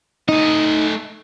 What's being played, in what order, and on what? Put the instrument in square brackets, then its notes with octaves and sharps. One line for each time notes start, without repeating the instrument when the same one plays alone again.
[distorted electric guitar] A3 D#5 [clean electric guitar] D#4